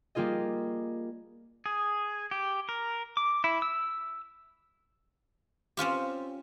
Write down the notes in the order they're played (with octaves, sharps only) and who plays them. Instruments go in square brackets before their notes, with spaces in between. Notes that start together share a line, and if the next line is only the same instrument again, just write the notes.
[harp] G3 A#3 F4 G#4 D#5
[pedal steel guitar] G#4
G4
A#4
D6
E4
E6
[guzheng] C4 C#4 F4 G4